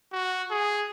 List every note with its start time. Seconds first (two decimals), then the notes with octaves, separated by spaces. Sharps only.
0.12 F#4
0.51 G#4